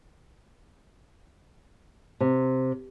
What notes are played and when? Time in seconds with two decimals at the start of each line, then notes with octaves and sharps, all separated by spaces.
2.21 C3